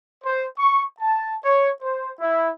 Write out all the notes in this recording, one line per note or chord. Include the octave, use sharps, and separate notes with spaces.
C5
C#6
A5
C#5
C5
E4